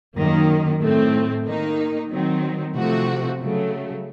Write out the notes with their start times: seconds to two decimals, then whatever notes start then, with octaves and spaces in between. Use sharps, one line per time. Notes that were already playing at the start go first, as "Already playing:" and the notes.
0.16 F#2 D#3 A#3
0.81 A2 A3 C4
1.45 D#3 A#3 D#4
2.10 D#3 F#3 C4
2.75 C3 F3 A3 C4 F#4
3.39 C#3 F#3 A3